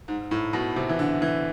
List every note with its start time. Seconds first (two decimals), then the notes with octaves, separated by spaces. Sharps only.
0.08 G#2
0.31 A2
0.53 B2
0.76 C3
0.89 E3
0.99 D3
1.22 E3